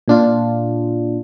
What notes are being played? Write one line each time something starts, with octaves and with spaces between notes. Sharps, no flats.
A#2 D4 F4